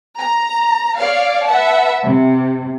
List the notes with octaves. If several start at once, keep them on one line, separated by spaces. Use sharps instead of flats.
A#5
C#5 D5 F5
B4 E5 F#5 A5
C3